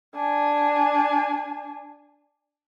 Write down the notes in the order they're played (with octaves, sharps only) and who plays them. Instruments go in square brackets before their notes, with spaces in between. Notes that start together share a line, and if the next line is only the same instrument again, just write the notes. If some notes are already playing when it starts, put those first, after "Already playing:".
[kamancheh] D4 G#5